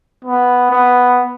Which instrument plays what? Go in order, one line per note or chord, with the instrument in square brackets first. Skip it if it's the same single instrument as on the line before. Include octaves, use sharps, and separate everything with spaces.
[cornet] B3
B3